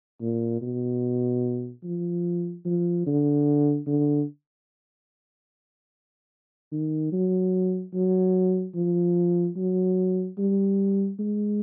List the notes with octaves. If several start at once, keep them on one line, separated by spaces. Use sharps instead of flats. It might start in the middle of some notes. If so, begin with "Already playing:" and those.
A#2
B2
F3
F3
D3
D3
D#3
F#3
F#3
F3
F#3
G3
G#3